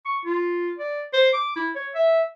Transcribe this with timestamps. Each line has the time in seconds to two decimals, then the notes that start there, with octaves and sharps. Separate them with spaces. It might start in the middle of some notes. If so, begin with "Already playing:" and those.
0.06 C#6
0.25 F4
0.78 D5
1.13 C5
1.33 D6
1.56 E4
1.76 C#5
1.95 E5